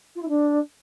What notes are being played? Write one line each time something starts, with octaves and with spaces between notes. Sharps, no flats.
F4
E4
D4